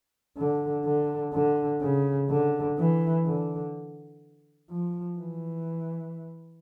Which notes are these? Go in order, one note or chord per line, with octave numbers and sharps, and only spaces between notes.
D3
D3
D3
C#3
D3
E3
D3
F3
E3